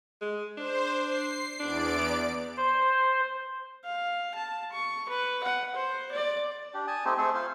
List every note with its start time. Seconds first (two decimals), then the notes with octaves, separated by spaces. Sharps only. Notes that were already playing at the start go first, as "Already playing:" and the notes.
0.21 G#3
0.57 D4 C5
1.01 C7
1.60 E2 D4 D5 D7
1.98 B3
2.57 C5
3.84 F5
4.34 A5
4.71 C#6
5.09 B4
5.43 F#5
5.75 C5
6.11 D5
6.74 D4 G4
6.88 G#5 A5 D#6
7.05 A3 C4 D#4 G4
7.18 A3 C4 G#4 A4
7.34 F4 C5